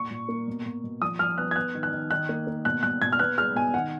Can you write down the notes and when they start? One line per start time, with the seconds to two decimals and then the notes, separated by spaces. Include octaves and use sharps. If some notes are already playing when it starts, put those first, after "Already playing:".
Already playing: A#2 C#6
0.10 A#2
0.29 A#3
0.47 B2
0.66 B2
0.84 B2
1.01 F3 D#6
1.19 F3 F6
1.38 B3 F#6
1.51 G#6
1.56 B3 F#6
1.75 D#3
1.83 F#6
1.92 D#3
2.11 D#3 F#6
2.29 A#3
2.47 A#3
2.65 B2 F#6
2.83 B2 F#6
3.02 B2 G#6
3.12 F6
3.19 B3 F#6
3.38 G#3 F6
3.55 B2 G#5
3.74 D#3 F#5